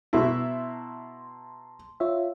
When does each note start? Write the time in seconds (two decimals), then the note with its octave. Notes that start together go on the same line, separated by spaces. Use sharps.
0.13 B2 E4 A5 A#5 C6
2.00 F4 C#5 E5